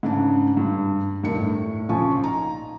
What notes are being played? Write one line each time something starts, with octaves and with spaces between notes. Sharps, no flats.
G#2 C#3 D4
G2
E1 G2 D#3 C#7
A2
A#1 C#3 F3 F4 G#5 C#6
D#4 A#5